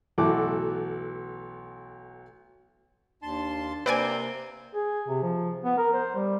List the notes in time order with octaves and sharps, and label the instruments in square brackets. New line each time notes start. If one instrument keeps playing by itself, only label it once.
[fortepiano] B1 E3 A3 F#4 A4 D6
[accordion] D#2 A5 C6 [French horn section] D4
[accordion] C3 [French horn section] A#3 [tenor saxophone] C4 [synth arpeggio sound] B4 D5 G#5
[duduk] G#4
C3
F3
B3
A#4
C5
G3